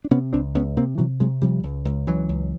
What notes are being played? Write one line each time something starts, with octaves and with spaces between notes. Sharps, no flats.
D4
C3 B3 C#4
C#2 C4 D4
C#2 B3 C#4
C3 A#3 C4
C3 E3 F#3
C3 F#3 G#3
C3 F3 G3
C#2
C#2
C#2 E3 F#3
C#2